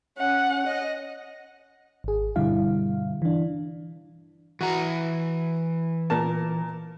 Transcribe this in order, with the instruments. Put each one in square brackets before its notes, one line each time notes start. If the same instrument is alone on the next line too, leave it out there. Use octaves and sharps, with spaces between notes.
[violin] C#4 [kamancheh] F#5
[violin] D#5
[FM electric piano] G#1 G#4
G2 B2 D3 G3 E4 F5
E3 D4
[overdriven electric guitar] E3 A#5 [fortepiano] F#4
[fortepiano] A#2 A#4 A5